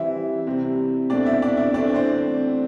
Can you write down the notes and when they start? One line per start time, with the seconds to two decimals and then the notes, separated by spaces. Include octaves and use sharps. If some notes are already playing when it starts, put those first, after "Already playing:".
Already playing: E3 G3 C4 E4 E5
0.47 C3 G3 C4
1.10 B2 A3 C4 D4 D5
1.26 E4 E5
1.42 D4 D5
1.57 E4 E5
1.74 E3 A3 C4 D4 D5
1.95 C4 C5